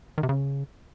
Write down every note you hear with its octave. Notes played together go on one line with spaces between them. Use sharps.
D#3
C3
C#3